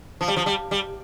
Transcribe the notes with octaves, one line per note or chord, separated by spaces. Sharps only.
F3
G3
F3
G3
G3